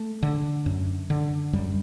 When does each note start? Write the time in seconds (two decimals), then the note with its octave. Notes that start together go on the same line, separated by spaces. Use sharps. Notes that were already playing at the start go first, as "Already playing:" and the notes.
Already playing: A3
0.23 D3
0.66 F#2
1.10 D3
1.53 F#2 G3